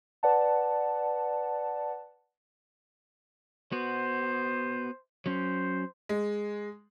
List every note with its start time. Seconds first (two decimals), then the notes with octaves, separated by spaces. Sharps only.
0.23 B4 D5 F#5 A5
3.72 B3 F#4 C5
5.26 F#3 C#4 C5
6.09 G#3